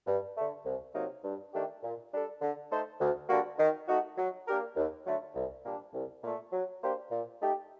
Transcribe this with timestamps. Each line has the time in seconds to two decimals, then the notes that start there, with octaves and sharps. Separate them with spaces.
0.07 G2
0.36 D3 A3
0.65 C2
0.95 C3 F#3 A#3 D#4
1.24 G2
1.53 D#3 A3 D4 G4
1.83 A#2
2.12 G3 D4 A4
2.41 D3
2.71 A3 D#4 A4 C5
3.00 D2
3.29 D3 G3 A#3 F#4
3.59 D#3
3.88 A3 D#4 F#4
4.18 F#3
4.47 A#3 D4 G4 A#4
4.76 D#2
5.06 D3 F#3 A3
5.35 C2
5.64 A#2 G3 A#3 D4
5.93 C2
6.23 A#2 A3
6.52 F#3
6.82 A#3 D4 G4 C5
7.11 A#2
7.40 A3 D#4 G4